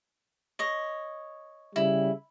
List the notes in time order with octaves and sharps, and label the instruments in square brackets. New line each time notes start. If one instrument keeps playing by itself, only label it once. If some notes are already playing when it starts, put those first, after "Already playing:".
[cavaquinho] C#5 D#5
[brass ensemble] C#3 G3 [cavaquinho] E4